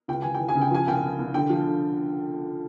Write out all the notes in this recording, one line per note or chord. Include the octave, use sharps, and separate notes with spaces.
C#2 G5
E3 G#5
G5
E3
G#5
C#3
G5
F3 G#5
C2 G5
C2
C2
D3 G5
F3
D3